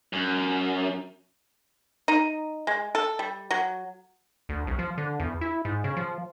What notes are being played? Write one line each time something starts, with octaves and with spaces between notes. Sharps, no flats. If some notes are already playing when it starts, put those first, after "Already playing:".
F#2
D#4
G#3
A4
G3
F#3
D2
C2
F3
D3
E2
E4
G#2
C#3
F3